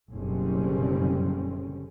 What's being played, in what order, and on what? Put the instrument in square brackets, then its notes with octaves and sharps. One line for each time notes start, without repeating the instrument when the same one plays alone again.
[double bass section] F#1 B2 D3 G3 C4 C#4